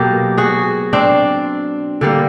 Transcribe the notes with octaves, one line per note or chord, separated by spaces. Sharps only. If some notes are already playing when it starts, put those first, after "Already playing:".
Already playing: B2 F#3 A#3 G4 A4
F#4 G#4
C4 D4
D3 G3 A#3